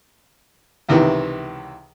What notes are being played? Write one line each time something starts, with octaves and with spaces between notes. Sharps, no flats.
C#2 C3 D#3 E3 B3